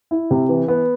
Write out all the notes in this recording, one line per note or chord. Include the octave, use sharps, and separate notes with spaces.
E4
C3
E3
B3